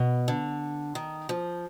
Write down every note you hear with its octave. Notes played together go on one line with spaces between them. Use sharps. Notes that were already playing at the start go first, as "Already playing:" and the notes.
Already playing: B2
D3
D#3
F3